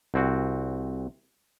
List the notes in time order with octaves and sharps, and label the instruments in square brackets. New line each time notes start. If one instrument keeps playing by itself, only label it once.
[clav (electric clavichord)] C2 C4 F#4